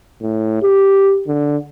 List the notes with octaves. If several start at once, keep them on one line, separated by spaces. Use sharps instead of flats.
A2
G4
D3